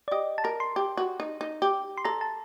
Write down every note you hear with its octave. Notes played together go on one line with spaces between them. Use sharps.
D5
G4 D#5
A5
A#4 A#5
C6
G4
F#4
D#4
D#4
G4
C6
A4 A#5
A5